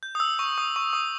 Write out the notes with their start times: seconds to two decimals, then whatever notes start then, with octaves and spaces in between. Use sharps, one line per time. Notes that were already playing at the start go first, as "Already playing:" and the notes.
0.03 G6
0.15 D#6
0.20 E6
0.39 C#6
0.58 D#6
0.76 C#6
0.93 D#6